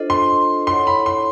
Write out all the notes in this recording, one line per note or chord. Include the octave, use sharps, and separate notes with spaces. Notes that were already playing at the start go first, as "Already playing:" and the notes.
Already playing: D4 F4 A4 C5 D#5
C6
E4 A4 C#5 F#5 C6
B5
C6